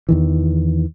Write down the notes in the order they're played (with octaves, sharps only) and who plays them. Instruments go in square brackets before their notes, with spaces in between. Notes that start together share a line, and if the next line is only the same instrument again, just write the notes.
[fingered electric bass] E2 D#3 E3